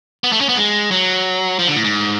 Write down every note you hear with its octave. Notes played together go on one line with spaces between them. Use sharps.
B3
A3
C#4
B3
G#3
F#3
F3
D3
A2
G#2